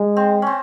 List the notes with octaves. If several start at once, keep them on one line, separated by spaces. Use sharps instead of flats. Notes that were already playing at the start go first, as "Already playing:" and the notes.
Already playing: G#3
C4
C4 C#4